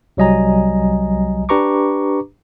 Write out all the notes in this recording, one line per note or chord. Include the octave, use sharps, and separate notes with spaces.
C2 F#3 G3 D#5 G#5 A#5
D4 G4 B4 A#5 C#6 D6